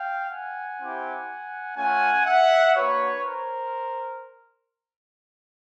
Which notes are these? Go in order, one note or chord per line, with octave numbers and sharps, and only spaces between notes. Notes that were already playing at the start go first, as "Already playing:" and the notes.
Already playing: F5 G5
F#5 G#5
C4 E4 G4
A3 C#4 F4 F#5 G#5
E5 F#5
A#3 D4 F#4 B4 C#5
A#4 C5